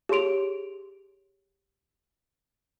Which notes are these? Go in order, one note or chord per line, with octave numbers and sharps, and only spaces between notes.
G4 G#4 C#5 C6 D7 F7